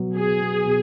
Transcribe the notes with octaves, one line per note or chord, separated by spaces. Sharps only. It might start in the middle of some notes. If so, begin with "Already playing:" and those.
Already playing: B2 F#3 B3
B3 G#4
B3
B2